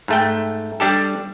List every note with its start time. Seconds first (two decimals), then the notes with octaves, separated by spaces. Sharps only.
0.08 G#2 A3 G5
0.80 G3 D4 G4 A4